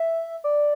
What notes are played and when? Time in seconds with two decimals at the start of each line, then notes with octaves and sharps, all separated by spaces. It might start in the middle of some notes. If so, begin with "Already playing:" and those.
Already playing: E5
0.44 D5